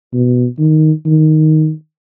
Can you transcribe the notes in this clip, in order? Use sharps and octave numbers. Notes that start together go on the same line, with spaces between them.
B2
D#3
D#3